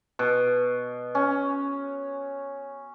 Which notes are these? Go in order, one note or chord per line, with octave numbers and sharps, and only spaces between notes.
B2
C#4